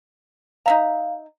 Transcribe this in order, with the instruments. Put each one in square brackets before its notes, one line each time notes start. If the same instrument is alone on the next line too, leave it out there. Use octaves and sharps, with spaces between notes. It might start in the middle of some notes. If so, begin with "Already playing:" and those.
[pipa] D#4 E5 A#5 [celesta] F5